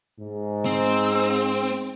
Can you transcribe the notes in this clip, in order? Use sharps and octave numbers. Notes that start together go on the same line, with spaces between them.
G#2
C4